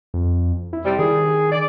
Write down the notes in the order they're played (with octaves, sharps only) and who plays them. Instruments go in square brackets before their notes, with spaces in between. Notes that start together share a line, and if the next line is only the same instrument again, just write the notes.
[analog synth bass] F2
E4
[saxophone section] C3 G3
[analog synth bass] D#3 [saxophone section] G#4
[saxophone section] D5